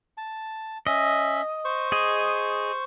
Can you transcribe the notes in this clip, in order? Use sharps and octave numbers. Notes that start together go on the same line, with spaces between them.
A5
C#4 D#5 E5
C5 C#6
G#4 D#5